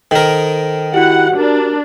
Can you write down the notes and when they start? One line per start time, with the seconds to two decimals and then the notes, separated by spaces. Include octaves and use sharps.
0.11 D#3 A4 A#4 C5
0.94 E4 F#4 G4 F#5
1.36 D4 A#4